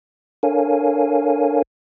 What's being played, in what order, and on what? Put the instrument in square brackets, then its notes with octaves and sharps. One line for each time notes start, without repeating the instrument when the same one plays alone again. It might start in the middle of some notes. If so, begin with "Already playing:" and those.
[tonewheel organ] D4 A4 A#4 C#5 F5 G#5